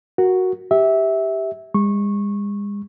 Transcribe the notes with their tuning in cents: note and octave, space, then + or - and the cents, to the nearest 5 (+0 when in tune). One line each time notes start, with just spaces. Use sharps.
F#4 +0 A#4 +0
G4 +0 E5 -15
G#3 -40 C#6 -20